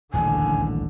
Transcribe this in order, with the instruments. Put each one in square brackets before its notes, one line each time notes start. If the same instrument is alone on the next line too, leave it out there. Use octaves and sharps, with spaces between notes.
[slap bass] D#1 A1 D2 [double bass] D3 [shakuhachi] G#5